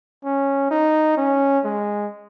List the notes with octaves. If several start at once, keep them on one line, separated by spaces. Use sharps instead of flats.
C#4
D#4
C#4
G#3